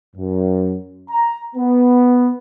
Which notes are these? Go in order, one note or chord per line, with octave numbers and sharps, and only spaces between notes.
F#2
A#5
B3